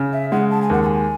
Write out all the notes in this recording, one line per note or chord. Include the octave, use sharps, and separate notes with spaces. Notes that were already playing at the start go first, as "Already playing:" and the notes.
Already playing: C#3
E5
G#3 F#5
A5
G#5
D#2 F#5
A5
G#5